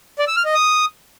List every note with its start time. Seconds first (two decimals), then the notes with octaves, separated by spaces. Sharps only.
0.19 D5
0.28 E6
0.36 F6
0.45 D#5
0.54 D#6